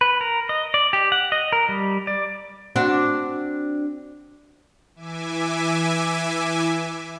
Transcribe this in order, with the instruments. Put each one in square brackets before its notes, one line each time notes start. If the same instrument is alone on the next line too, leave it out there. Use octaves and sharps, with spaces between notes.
[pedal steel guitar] B4
A#4
D#5
D5
G4
F#5
D#5
A#4
G3
D5
[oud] C4 D4 F#4
[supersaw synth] E3 E5 G#5 D6